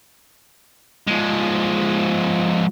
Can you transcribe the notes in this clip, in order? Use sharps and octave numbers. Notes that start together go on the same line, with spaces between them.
F3 G#3